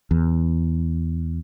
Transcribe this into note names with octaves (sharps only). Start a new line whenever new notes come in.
E2